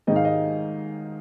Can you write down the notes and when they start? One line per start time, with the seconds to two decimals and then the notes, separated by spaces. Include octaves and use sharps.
0.07 G#2 D#3 G#3 D#4 D#5
0.16 F5
0.25 D#5